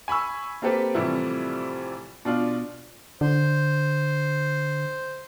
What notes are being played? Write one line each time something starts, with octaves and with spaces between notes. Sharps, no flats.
G#5 B5 C#6 E6
A#3 C4 G4 A4 B4
A2 C3 E3 F3 G3 E4
B2 D4 F4
D3 C5